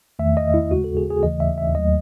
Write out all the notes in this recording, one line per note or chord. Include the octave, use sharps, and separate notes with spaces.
E2 D#3 A3 E5
D#5
E4
D#2 C#3 G#3 F#4
A4
G#4
G#4
D#2 C#3 E3 A3 D#5
E5
E5
D#2 D#3 F#3 A3 D#5